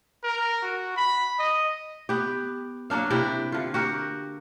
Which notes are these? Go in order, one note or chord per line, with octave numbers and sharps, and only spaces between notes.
A#4
F#4
B5
D#5
B3 G4
F#3 A#3 D4 F5
C3 E4 D5 G5
D3 F4
F#4 G4 A#4